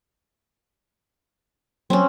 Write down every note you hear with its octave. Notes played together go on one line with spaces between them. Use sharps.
F#3 C4 C#4